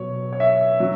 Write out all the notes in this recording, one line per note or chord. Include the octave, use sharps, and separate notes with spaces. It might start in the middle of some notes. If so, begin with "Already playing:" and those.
Already playing: B2 F#3 C#5
C#5
E5
F#3